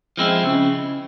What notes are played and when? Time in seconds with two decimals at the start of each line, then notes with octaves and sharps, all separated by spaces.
0.17 F3 G#3 C4 E4
0.43 C#3